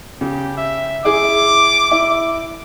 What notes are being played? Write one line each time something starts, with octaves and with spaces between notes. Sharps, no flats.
C#3 G4
E5
E4 G#4 D6
E4